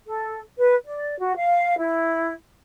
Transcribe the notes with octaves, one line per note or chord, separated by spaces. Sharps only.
A4
B4
D5
F#4
F5
E4